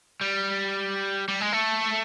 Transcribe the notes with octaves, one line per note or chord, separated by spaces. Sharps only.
G3
G3
G#3
A3